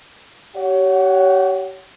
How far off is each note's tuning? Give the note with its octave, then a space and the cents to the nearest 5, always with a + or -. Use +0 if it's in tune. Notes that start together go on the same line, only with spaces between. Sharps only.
G4 -30 C#5 +20 F#5 +0